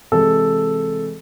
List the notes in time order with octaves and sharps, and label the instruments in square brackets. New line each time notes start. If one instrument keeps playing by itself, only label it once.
[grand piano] C3 E3 G#3 A4